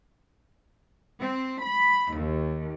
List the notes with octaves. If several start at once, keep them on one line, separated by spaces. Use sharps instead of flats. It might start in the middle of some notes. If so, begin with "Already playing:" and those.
C4
B5
D#2